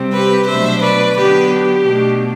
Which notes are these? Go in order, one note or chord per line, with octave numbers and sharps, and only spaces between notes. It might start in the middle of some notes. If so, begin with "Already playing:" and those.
Already playing: C3 G3 C4
G4 B4
B2 F#3 A3 D4 C5 E5
B4 D5
D3 F#3 B3 D4 G4 B4
G4
B2 A3 D4